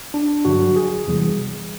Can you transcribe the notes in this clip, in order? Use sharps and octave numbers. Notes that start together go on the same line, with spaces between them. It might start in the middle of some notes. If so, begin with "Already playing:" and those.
D4
G2 D3 F#3 F#4
G#4
E2 C3 E3 G3